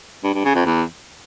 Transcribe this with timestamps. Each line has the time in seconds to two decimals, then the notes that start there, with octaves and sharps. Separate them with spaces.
0.24 G2
0.34 G2
0.45 C#3
0.55 F2
0.66 E2